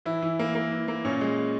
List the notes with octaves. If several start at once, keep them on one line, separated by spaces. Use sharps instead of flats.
E3 E4
E3
A#3
A#3
E3
A#3
A#2 C#4
G#3
G#3